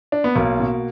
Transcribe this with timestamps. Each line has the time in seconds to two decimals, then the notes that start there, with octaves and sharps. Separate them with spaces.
0.12 D4
0.24 B3
0.36 B1 A#3
0.60 B2